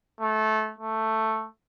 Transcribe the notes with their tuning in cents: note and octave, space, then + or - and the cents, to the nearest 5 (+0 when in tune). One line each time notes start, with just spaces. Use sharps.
A3 -20
A3 +5